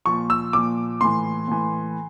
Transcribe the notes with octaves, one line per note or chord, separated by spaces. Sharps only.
A#2 F3 C#6
E6
A#2 F3 D6
A2 E3 C6
A2 E3